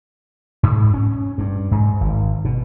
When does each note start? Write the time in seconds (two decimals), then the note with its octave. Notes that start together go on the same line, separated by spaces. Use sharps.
0.63 G#2
0.94 C#4
1.38 G2
1.71 G#2
2.01 G#1
2.45 B2